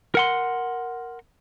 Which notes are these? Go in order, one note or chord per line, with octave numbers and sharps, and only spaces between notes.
A#4 F#5 C6